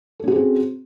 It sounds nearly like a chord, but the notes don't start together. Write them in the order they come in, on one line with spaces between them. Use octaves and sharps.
A4 C#4 F#4 G#4 C4